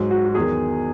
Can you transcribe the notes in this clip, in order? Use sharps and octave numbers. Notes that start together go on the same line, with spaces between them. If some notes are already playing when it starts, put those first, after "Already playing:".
Already playing: G#2 F#3
F#4
F#4
E2 D#3 F#3 G#4